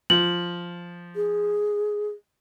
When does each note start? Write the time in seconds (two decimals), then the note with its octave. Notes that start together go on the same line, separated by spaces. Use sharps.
0.10 F3 F#7
1.16 G#4